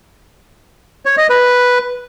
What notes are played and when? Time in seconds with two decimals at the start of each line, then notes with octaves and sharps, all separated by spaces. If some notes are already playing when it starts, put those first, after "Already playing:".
1.06 C#5
1.18 D#5
1.29 B4